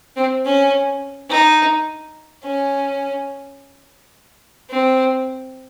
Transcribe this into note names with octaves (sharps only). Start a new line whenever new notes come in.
C4
C#4
D#4
C#4
C4